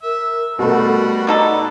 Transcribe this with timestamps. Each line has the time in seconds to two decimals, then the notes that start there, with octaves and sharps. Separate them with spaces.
0.03 A#4 E5
0.59 B2 G3 A3 F#4 F#5
1.27 B3 D4 D#4 F#4 A4 D5